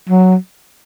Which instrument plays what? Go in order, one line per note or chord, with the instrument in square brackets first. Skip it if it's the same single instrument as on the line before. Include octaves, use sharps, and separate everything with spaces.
[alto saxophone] F#3